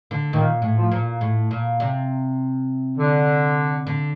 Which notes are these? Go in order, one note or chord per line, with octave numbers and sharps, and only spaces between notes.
D3
A#2 D#3
A2
F3
A#2
A2
A#2
C3
D3
D3